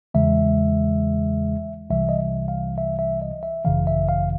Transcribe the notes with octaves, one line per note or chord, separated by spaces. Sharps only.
E2 C#3 E3 G#3 E5
C2 C3 E3 G3 E5
D#5
E5
F5
E5
E5
D#5
E5
G#1 F#2 C#3 E3 F5
E5
F5